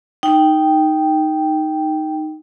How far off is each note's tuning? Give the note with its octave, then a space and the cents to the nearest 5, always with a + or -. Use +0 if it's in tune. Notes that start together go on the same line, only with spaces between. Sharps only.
D#4 +0 G5 +0